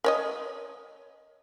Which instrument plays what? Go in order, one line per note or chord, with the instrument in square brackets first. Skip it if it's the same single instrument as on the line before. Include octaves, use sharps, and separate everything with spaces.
[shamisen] A#4 C#5 D#5